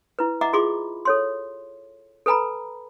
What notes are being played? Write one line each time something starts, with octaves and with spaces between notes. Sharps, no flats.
E4 B4
D#5 E5 F#5 A#5 D6
F4 G#4 B5 C6 D6
A4 C#5 C6
A4 B4 G#5 A#5 B5